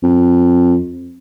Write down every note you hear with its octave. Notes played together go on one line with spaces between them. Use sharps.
F2